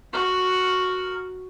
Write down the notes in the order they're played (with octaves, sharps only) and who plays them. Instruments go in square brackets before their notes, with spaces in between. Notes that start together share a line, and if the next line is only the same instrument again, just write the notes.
[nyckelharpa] F#4 [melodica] A#4